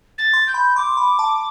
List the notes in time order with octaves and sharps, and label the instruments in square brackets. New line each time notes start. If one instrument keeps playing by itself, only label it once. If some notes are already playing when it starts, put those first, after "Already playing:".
[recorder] A6
[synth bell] C6
[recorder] G6
[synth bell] B5
[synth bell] C6 [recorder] D6
[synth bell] B5
A5